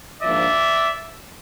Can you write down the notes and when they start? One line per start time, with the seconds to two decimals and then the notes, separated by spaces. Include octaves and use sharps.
0.22 G#2 F3 A#3 D4 D5 E5